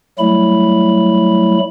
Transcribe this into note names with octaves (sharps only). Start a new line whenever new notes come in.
F#3 G3 A3 E4 B5